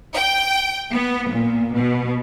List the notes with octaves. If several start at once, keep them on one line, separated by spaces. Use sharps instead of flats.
G5
B3
A#2
B2